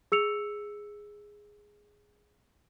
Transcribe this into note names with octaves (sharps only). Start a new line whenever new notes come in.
G#4 E6 C#7 F7